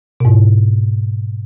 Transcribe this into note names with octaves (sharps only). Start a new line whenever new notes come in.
G#2 B2